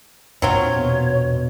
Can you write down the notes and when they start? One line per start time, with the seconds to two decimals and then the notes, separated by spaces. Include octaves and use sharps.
0.42 E2 A#2 F#3 C4 D4 F4 C#5
0.77 B2